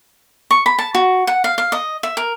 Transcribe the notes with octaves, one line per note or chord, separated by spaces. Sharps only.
C#6
B5
A5
F#4
F#5
F5
F5
D#5
E5
A#4